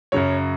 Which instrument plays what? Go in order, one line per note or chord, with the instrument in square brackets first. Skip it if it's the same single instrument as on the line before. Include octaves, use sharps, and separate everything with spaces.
[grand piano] F#2 C#3 F#3 C#5